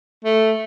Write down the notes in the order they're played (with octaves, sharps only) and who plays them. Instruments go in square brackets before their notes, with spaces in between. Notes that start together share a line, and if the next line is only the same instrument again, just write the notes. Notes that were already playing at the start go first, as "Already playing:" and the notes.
[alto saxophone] A3